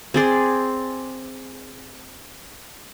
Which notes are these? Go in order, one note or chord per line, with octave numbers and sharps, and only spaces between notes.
C4 G#4 D5